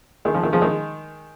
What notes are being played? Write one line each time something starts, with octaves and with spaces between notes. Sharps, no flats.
D#3 G#3
C#3 F3
D#3
C#3 F3
D#3 G#3